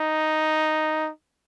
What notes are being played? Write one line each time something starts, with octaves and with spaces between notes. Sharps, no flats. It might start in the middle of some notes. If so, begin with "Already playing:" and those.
Already playing: D#4